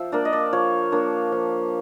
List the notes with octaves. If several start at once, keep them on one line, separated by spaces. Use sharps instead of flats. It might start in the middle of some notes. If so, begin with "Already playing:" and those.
Already playing: F3 E5
A#3 D4 D5
D#5
D5
F3 C#5
A#3 D4 C#5
F3